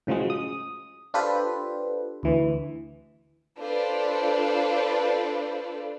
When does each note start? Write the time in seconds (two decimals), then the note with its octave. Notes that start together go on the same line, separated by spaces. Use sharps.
0.07 A2 C#3 F3 F#3 G#3
0.30 D#6
1.14 D4 F4 G4 A4 B4 C5
2.23 D2 E3
3.60 D4 F4 A4 B4 C5 D5